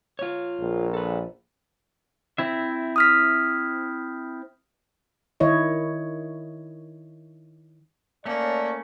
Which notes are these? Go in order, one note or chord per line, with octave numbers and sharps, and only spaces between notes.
F4 C#5
A#1
A4 B4
C4 E4 E5
D#6 F6 B6
D#3 E4 C#5 D#5
A3 A#3 C#4 C#5 D5 A5